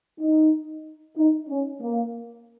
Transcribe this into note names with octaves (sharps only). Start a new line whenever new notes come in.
D#4
D#4
C#4
A#3